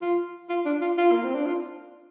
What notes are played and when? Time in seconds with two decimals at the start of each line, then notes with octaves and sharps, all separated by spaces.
0.02 F4
0.49 F4
0.66 D4
0.81 F4
0.98 F4
1.12 A#3
1.24 C4
1.35 D4
1.46 F4